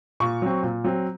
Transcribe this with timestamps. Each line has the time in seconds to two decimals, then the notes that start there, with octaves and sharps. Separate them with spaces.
0.20 A#2 C#6
0.42 F#3 C4
0.63 A#2
0.84 F#3 C4